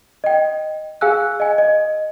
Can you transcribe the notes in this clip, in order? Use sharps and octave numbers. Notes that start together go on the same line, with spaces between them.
D#5 G5
G#4 F5 G#5 E6 F#6
D#5 G#5
D#5